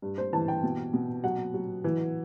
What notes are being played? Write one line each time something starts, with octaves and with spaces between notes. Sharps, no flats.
G2
C5
E3 A5
G5
B2
B2
F#3 F#5
F#3
E3